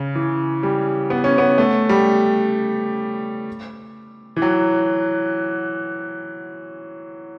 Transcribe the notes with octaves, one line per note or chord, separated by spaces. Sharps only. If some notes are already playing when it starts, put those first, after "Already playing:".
Already playing: C#3
E3
G3
B3
C#4
B3
A3
G3
E3
F#3